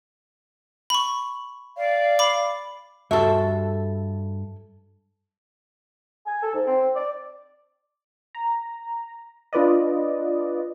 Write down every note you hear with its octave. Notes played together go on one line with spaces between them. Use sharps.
B5 C#6
D5 F5
B5 D6
G2 F#4 A4 E5 A5
G#5
A4
G#2
C4
D5
A#5
D4 F4 B4 D5 D#5